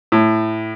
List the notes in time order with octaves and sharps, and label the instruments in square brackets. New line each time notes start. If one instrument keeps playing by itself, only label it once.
[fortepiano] A2